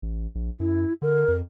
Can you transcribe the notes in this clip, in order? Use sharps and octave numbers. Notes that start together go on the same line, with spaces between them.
A1
A#1
F#2 E4
D3 A#4
F2